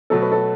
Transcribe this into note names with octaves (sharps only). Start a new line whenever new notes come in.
B2 F#3 A3 A4
B4
A4